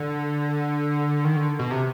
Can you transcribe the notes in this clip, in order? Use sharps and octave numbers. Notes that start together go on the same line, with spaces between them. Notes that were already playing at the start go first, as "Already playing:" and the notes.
Already playing: D3
D#3
D3
B2
C3